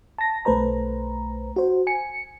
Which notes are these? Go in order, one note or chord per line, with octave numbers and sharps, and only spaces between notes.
A5 A#6
B1 A3 B4 C5 A#5
F#4 C5
G#5 C#7